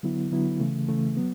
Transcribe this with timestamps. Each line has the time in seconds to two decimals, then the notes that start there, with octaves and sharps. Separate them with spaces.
0.03 D3 F#3 B3 E4
0.32 D3 F#3 B3 E4
0.60 C#3 E3 A3
0.88 C#3 E3 A3
1.17 F#3 B3